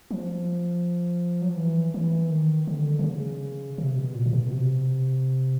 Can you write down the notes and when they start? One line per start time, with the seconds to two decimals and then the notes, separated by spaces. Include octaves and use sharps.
0.11 F3
1.42 F#3
1.49 F3
1.57 E3
1.94 E3
2.30 D#3
2.67 D3
2.99 D3
3.04 C#3
3.78 C3
3.97 B2
4.14 A#2
4.26 A#2
4.33 B2
4.51 C3